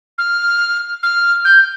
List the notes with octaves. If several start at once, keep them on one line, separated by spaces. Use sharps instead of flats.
F6
F6
G6